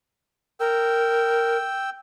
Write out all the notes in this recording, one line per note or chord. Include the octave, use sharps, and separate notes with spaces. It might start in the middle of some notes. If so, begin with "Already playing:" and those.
A#4 G5 E6